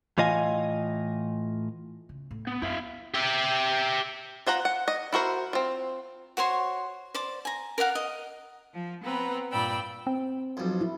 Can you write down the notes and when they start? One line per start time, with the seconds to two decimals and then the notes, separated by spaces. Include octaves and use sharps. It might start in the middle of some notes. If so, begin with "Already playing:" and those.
0.18 A2 E3 F4 D#5 F5 G#5
2.09 C#3
2.31 A2
2.47 B3
2.62 F#2 E4 E5 F5
3.14 G4 E5
4.47 F4 C5 F#5 A#5
4.65 F#5
4.88 D#5
5.13 E4 F#4 A#4 C5
5.53 C4 F4
6.37 F#4 C5 C#5 C6
7.15 C5 D5 D6
7.45 G#5 A#5
7.78 A#4 D5 F5 F#5
7.95 D#5
8.74 F3
9.03 B3 C4 B4 A#5
9.52 G2 A#2 D5 G5 B5 E6
10.07 C4
10.57 B1 F2
10.81 E4